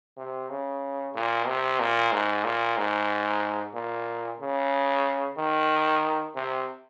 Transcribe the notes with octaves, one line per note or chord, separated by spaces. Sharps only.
C3
C#3
A#2
C3
A#2
G#2
A#2
G#2
A#2
C#3
D#3
C3